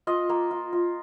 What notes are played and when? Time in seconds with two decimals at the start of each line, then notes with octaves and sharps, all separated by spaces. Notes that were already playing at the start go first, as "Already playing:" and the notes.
0.07 F4 D#5
0.29 A#3
0.51 F4
0.73 F4